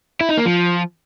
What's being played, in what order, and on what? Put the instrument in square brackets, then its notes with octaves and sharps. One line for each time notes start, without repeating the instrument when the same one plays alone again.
[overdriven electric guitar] E4
D#4
A#3
F3